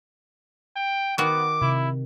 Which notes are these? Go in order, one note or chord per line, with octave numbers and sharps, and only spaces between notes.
G5
D#3 B3 F#4 D6
C3 E4